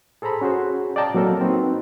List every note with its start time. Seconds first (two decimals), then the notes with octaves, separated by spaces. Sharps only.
0.22 G#4 A4 C5 A#5 B5
0.41 C#4 F#4 G#4 C5
0.96 D5 D#5 F5 G5 A5 A#5
1.14 F#3 A#3 C4 A4 A#4
1.41 C4 D#4 F#4 B4